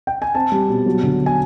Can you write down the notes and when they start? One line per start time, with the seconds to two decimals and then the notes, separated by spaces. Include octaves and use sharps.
0.07 G5
0.22 G#5
0.35 C4 A5
0.52 G3
0.69 B2
0.86 F#3
1.03 D3
1.26 G#5